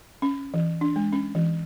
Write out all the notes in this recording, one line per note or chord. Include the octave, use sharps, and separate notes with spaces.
C#4
E3
D4
G#3
C#4
E3